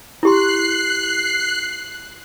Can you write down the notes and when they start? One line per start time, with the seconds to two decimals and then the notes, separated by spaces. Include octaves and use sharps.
0.23 E4 G4 C6 F#6 C7